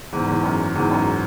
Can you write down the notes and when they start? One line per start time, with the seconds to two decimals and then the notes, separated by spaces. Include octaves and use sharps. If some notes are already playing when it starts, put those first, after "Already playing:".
0.12 E2 G#2
0.28 E2
0.44 F#2
0.75 E2 G#2
0.91 F#2